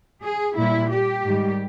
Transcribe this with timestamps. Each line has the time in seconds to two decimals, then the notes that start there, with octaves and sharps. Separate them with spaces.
0.24 G#4
0.57 A#2 G3 E4
0.91 G4
1.25 G#2 D#3 G3